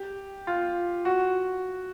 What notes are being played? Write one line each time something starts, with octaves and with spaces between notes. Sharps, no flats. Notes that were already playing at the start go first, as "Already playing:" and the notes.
Already playing: G4
F4
F#4